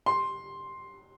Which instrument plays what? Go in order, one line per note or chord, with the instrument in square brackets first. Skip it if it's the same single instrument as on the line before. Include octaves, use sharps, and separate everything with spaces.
[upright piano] C6